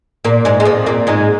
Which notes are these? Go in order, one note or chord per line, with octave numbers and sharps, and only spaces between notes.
A#2 A#3
G#2 G#3
G#3
F2 F3
A#2 A#3
G#2 G#3